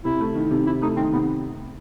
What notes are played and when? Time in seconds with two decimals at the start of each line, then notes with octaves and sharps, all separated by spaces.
0.04 C3 E4
0.20 A3
0.35 D#3
0.51 C3
0.66 C3 E4
0.82 A3 D#4
0.97 D#3 C4
1.12 C3 B3